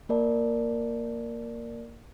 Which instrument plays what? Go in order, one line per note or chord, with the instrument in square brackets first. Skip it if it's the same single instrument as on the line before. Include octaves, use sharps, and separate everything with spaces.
[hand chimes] A#3 A#4 D5 A5